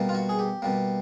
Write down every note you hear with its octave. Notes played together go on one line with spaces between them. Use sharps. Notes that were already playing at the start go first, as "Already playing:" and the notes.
Already playing: B2 G3 A#3
F4
F#4
G#4
G4
B2 G3 A#3